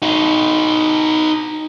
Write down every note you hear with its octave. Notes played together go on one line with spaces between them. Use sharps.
D#4 F#4